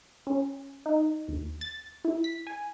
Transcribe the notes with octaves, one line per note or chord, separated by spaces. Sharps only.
C#4
D#4
D#2
A6
E4
B6
G#5